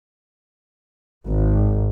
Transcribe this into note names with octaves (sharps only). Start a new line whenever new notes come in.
G#1